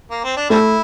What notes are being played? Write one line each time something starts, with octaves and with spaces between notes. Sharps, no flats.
A#3
C4
D4
G3 A3 C4 E4